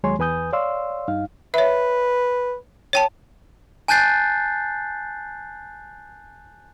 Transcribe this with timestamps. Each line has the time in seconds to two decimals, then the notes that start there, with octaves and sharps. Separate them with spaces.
0.04 D#2 F#3 G#3 C#5 G#5 C6
0.19 E2 B4 G#5 D#6 G6
0.53 C#5 D5 F5 C6 E6
1.08 G2 D#4 F5
1.54 B4 C#5 E5
2.93 C#5 G5 A5
3.88 G#5 A5 F#6 G6 A6 C7